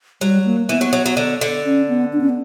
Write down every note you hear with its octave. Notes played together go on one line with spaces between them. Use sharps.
F#3 G3
A#3
E3 B3
F#3
F#3
F#3
D3
D3
C#4
B3
D4
C#4
B3